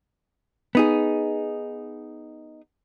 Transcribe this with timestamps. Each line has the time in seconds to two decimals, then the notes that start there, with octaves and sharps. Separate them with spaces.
0.75 B3 D#4 G#4